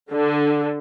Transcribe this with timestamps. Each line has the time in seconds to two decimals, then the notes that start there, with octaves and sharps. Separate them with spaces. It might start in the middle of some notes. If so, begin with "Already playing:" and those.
0.11 D3